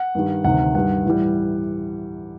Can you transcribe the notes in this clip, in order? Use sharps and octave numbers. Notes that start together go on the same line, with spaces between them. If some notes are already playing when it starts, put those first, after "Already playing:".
Already playing: F#5
G2 D#3 G3
D2 C3 D#3 F#5
G2 D#3 G3 F#5
A2 E3 G3